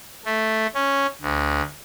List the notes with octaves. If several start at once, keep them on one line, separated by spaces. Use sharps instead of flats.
A3
C#4
D2